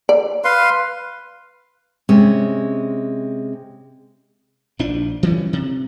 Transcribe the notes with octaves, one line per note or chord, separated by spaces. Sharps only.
D5
B4 F5 C6
C3 G#3 C#4
A#1 F3 D4
E3 G3 C4 C#4
C3